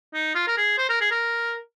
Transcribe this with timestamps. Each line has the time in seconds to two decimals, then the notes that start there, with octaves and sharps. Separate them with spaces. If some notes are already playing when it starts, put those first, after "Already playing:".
0.14 D#4
0.35 F4
0.48 A#4
0.58 G#4
0.78 C5
0.89 A#4
1.01 G#4
1.11 A#4